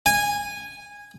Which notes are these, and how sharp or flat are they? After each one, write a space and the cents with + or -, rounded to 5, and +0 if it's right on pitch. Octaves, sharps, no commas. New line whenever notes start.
G#5 -15